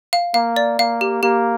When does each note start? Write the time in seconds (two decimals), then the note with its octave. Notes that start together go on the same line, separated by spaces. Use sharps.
0.13 F5
0.34 A#3 F5
0.56 D5
0.78 A#3 F5
1.01 G4
1.23 A#3 G4